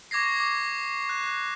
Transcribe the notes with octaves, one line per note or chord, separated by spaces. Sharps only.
C#6 D6 G#6 A#6 C7
D6
F#6